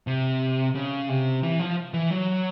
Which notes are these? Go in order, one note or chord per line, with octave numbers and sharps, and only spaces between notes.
C3
C#3
C3
E3
F3
E3
F#3